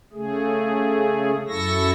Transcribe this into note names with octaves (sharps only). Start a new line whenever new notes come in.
C#3 A3 G#4
F#2 E4 A4 C#6 E6 A#6